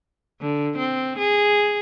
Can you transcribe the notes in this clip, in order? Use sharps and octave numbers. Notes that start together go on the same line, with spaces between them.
D3
C4
G#4